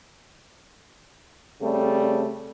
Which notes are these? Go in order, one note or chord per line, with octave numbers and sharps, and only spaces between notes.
C#3 G3 A3 C4